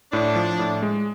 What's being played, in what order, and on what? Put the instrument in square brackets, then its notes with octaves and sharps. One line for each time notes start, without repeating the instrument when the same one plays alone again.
[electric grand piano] A2 [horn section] D4
[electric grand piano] F3
A2
G#3